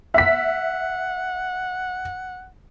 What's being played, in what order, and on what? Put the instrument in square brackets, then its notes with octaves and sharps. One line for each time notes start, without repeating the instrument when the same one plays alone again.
[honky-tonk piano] E5 B6 [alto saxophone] F#5